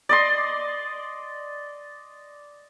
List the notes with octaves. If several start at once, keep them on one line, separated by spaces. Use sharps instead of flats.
D5 D#5 C6